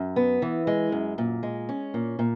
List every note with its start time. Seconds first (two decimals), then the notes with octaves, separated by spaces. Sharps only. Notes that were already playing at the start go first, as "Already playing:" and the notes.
Already playing: F#2
0.16 B3
0.42 E3
0.67 G#3
0.92 F#2
1.18 A#2
1.43 G#3
1.69 C#4
1.94 A#2
2.19 A#2